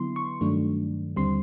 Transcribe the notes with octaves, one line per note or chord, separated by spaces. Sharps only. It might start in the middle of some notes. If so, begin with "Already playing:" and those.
Already playing: D3 F#3 B3 E4 C6
C#6
G2 D#3 F#3 A3 D4
D#2 D3 G3 C4 C6